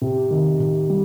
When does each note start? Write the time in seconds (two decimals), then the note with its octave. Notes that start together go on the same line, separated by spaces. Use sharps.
0.01 C3
0.30 D#3
0.59 C3
0.90 G3